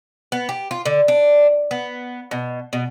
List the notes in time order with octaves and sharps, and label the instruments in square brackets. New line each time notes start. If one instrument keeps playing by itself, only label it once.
[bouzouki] B3
G4
F4
D3
D4
B3
B2
B2